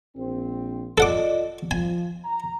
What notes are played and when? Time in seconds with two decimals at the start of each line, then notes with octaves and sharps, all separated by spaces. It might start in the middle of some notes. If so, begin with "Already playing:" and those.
0.16 A#1 C4
0.98 F4 A4 D5 D#5 F#5 D6
1.71 F3 G#5
2.25 A#5